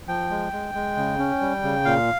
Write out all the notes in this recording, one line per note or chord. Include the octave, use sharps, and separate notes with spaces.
F3 G5
G#3
G#3
G#3
C#3
C#4
G3
C#3
A#2 F5